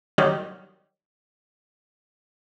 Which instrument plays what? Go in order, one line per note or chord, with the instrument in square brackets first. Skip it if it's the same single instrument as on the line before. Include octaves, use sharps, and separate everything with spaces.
[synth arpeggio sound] D#3 F#3 G3